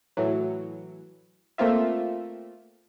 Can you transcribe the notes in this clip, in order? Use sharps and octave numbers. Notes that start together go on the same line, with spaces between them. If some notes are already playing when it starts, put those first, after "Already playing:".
A2 E3 F#3
A3 A#3 C4 F4 E5